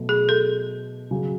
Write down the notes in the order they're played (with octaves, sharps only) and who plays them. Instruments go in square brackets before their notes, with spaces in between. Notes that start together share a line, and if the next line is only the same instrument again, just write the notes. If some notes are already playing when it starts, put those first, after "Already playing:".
Already playing: [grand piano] B2 F#3 A3
[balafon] G#4
A4
[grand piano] C#3 F#3 C#4